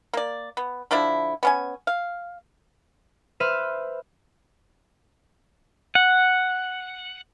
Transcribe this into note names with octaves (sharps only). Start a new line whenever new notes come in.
A#3 D5
B3
D3 F3 D4 E4
B3 C#4 G#5
F5
B4 C5 E5 E6 F6 D#7
F#5